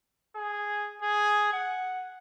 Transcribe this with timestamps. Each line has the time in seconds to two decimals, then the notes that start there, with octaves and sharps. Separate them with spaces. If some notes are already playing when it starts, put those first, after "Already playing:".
0.36 G#4
1.02 G#4
1.53 F#5